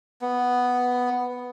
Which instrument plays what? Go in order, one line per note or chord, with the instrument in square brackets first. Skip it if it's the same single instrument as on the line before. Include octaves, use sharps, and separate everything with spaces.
[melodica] B3